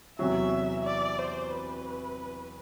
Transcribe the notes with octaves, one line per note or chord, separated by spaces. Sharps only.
E2 C3 F#3 E5
D5
C5
B4